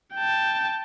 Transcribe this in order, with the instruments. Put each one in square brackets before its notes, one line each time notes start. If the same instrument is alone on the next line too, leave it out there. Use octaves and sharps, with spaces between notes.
[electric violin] G5 A5